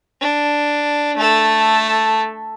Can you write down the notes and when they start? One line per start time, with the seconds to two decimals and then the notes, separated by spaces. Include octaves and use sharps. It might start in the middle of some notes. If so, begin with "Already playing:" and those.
0.21 D4
1.17 A3 A4